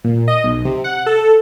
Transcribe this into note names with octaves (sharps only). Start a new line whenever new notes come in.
A#2
D#5
B1
C3
F#5
A4